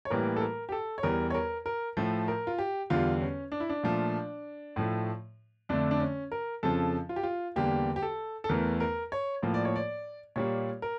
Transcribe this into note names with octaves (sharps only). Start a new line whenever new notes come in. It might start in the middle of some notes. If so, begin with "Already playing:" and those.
C#5
A2 E3 G3 A#3 A#4
A4
A#4
G4
A4
C#5
E2 E3 G3 A#4
C#5
A#4
A#4
A2 F3 A3
A#4
F4
G4
E2 D3 G3 F4
C#4
D4
E4
D4
A#2 F3 A3
A2 F3 A3
F2 D3 A3 D4
D4
C#4
A#4
F2 C#3 F3 A4
F4
G4
F4
E2 D3 G3 A#3 G4
G4
A4
A4
E2 E3 A3 A#4
A#4
C#5
A2 F3 A#3
D5
C#5
D5
A#2 G3 A#3 C#5
A#4